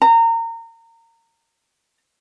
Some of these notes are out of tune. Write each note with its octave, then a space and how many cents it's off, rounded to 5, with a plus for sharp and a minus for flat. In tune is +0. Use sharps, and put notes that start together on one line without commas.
A#5 -30